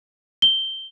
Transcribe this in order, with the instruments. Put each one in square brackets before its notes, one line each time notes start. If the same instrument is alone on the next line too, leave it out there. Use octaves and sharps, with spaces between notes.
[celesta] G7